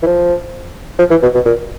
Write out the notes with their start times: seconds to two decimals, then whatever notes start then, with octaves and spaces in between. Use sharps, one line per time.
0.03 E3
0.06 F3
0.99 F3
1.10 E3
1.22 B2
1.34 B2
1.45 A#2